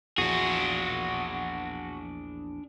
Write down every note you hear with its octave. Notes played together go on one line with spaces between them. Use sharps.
A#1 E2 D4 F#4 G#4